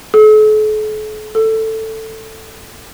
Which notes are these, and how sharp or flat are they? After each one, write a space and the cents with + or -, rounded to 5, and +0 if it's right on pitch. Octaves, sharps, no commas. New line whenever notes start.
A4 -45
A4 +10